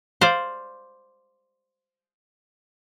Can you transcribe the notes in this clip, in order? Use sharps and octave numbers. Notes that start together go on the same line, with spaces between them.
C5 D5 F5